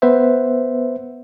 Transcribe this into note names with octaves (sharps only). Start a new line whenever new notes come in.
B3 B4 C5 E5